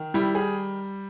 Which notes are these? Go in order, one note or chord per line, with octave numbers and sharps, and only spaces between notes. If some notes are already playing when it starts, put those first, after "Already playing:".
Already playing: D#3
G3 E4
G#4